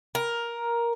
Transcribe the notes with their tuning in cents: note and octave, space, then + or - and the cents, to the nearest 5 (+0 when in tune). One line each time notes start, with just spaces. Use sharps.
A#4 +10